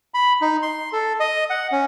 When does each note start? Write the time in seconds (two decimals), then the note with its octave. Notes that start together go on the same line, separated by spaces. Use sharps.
0.14 B5
0.41 D#4
0.62 C6
0.93 A4
1.20 D#5
1.50 F#5
1.72 C#4